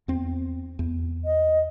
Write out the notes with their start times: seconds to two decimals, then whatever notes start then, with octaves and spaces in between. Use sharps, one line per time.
0.08 E2 C4
0.79 E2
1.25 D#5